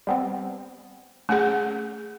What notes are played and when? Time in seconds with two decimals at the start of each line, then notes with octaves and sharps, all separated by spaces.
0.07 G3 B3 C4
1.29 A3 C#4 G#4 F#5